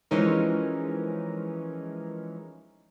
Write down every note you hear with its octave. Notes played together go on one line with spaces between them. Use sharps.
E3 F3 G#3 C#4 D#4 A#4